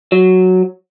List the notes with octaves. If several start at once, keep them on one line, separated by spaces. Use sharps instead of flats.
F#3